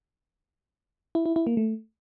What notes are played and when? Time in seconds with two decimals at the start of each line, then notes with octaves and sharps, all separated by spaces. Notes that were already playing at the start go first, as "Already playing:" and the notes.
1.15 E4
1.26 E4
1.36 E4
1.47 A#3
1.57 A3